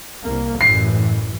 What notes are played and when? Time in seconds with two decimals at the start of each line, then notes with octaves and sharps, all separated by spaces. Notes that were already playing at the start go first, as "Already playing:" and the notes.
0.24 C2 A#3
0.61 A1 F#2 E3 C7